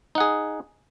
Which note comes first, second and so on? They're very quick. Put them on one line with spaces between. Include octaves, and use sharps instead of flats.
D#4 F#5 G#4